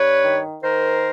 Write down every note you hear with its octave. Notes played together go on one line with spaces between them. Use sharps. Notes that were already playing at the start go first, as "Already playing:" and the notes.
Already playing: G2 B4 C#5
D#3
D#3 A#4 C5